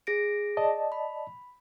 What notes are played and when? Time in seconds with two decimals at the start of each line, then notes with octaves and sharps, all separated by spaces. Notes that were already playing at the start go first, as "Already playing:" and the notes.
0.07 G#4 A#6 D7
0.57 D5 D#5 A5
0.92 B5